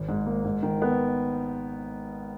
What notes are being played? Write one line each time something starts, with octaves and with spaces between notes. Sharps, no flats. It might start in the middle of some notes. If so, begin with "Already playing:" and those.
Already playing: G#1
G#2
A#3
G#2
D#3
B3